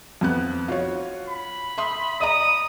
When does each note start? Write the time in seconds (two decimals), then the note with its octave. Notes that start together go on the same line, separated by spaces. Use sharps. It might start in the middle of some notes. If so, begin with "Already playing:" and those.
0.21 F2 B3 F#6
0.68 F4 F#4 C#5
1.29 B5
1.78 E5 C6 D#6
2.20 D5 D#5 A#5 D#6